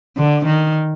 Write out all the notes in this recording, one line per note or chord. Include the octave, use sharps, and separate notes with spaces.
D3
D#3